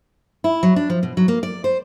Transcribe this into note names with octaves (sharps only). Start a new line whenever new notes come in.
E4
F#3
D4
F3
B2
F#3
A#3
D5
C5